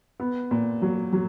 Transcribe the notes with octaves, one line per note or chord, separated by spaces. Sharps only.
B3
A#2
F#3
F#3